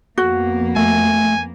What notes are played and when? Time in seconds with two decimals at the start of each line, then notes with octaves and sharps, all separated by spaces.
0.18 F2 A#3 B3 F#4
0.76 A3 G#5